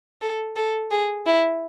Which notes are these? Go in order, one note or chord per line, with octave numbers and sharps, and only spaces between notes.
A4
A4
G#4
E4